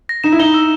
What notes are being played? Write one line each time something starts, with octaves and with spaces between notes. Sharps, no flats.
A#6
D#4 E7
E4
D#4 G7
E6